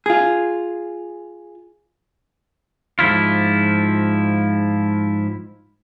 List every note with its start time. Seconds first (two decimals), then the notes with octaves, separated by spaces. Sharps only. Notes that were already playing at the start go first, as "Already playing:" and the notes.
0.06 F4 G#4
2.99 G#2 F3 E4 F4